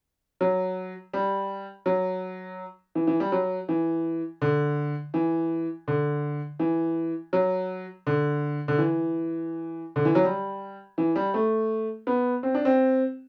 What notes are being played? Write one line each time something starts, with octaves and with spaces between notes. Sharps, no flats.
F#3
G3
F#3
E3
E3
G3
F#3
E3
D3
E3
D3
E3
F#3
D3
D3
E3
D3
E3
F#3
G3
E3
G3
A3
B3
C4
D4
C4